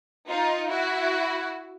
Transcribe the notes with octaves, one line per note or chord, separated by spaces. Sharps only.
D#4 F4
E4 F#4